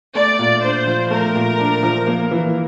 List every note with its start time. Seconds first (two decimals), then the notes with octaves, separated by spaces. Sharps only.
0.15 A3 D5
0.39 A#2
0.63 D4 C5
0.87 F3
1.10 A3 A#4
1.35 A#2
1.59 D4
1.83 F3
2.07 A#3
2.31 E3